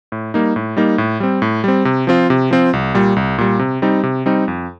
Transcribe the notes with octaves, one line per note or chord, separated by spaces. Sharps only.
A2
G3 A#3 D#4
A2
G3 A#3 D#4
A2
G3 C4
A2
G3 C4
C3
F3 C4 F4
C3
F3 C4 F4
C2
A#2 G3
C2
A#2 G3
C3
G3 C4 D#4
C3
G3 C4 D#4
F2